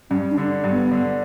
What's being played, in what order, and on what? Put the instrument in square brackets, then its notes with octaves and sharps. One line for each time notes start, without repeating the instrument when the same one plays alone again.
[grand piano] G2 [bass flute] C#4
[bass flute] D4
[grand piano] D3
G2
[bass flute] B3
[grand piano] D3